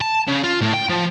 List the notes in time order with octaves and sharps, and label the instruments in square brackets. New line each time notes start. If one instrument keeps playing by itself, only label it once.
[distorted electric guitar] A5
C#3
F4
A2
G5
F3